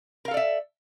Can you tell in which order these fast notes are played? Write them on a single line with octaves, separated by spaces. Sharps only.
A#4 F5 A4 D5 E5